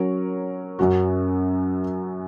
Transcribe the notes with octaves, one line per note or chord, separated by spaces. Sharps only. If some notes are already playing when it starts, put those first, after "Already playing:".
Already playing: F#3 C#4 A#4 C#5
F#2 F#3 C#4 F#4